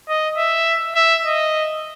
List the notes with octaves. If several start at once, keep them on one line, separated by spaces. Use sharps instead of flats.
D#5
E5
E5
D#5